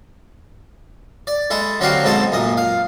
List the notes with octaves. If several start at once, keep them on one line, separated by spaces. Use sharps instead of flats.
D5
G#3 E4 A4
D3 F#3 C4 F#4 G4 F5
G#2 B2 C4 A4 D#5 A5
F#2 A#2 D#5
F5